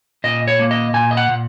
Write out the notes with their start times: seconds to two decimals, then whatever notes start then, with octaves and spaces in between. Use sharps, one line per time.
0.24 A#2 D#5
0.48 C#5
0.59 A#3
0.71 D#5
0.94 A#2 G#5
1.11 D#5
1.17 F#5
1.29 A#2